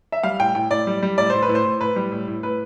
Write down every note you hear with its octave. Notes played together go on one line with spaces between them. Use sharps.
E5
G3 F5
A2 G5
A2 G5
A2 D5
G3
G3
A2 D5
A2 C5
B4
A2
C5
A2
A2 B4
G3
A2
A2
A2 B4